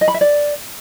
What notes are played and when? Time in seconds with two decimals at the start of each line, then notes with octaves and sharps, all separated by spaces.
0.01 D#5
0.08 B5
0.14 E5
0.21 D5